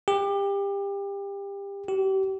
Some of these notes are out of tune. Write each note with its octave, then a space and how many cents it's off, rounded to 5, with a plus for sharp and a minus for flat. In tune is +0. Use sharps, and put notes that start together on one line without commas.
G4 +25
G4 -35